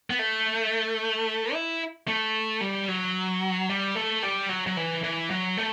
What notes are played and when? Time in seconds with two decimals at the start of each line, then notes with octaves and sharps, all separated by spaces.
0.10 B3
0.19 A3
1.53 E4
2.08 A3
2.61 G3
2.88 F#3
3.69 G3
3.95 A3
4.23 G3
4.49 F#3
4.67 F#3
4.77 E3
5.04 E3
5.31 F#3
5.57 A3